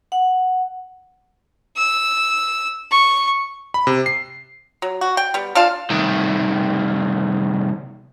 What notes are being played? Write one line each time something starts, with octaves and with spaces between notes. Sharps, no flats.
F#5
E6
C#6
B5
C3
C7
F#3
F#4
G5
G3 B3
D4 F4 F5 A5
C2 D#3